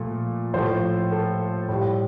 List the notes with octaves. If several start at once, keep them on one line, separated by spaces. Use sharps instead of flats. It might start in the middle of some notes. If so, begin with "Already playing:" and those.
Already playing: A#2 F3 A3
A2 F3 A3 C5
A4
A2 G3